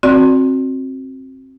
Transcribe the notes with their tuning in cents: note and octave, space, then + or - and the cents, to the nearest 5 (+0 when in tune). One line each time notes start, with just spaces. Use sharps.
C4 +20 F#4 -15 D5 +0